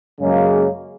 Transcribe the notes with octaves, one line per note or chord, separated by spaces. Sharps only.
F#2 C#3 G#3 A#3